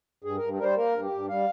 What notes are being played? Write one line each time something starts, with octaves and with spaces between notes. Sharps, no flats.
G2 G#4
G2 A#4
G3 A#4 C5
A#3 A#4
G2
G4
G2
G3 F5